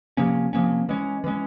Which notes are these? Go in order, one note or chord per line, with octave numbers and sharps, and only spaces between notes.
C3 F3 A#3 C#4
C3 F3 A#3 C#4
E3 G#3 C#4
E3 G#3 C#4